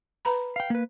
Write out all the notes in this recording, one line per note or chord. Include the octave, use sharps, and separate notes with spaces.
B4 A#5 B5
F5 G5
A#3 B4